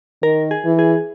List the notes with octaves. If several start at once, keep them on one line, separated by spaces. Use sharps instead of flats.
D#3 A#4
G#4
E3
G#4